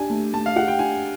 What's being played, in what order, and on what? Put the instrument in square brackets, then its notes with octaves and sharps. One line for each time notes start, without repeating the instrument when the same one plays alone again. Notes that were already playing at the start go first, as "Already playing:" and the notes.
Already playing: [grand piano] D4 G4 [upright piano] G#5
[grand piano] A3
[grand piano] A3 [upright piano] A5
[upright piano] F5
[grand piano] G4 [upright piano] F#5
[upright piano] G5
[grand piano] D4 [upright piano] G#5